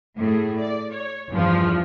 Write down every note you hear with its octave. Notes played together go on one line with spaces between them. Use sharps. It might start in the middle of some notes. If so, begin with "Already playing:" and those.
A2 G#4
D5
C#5
E2 G2 F3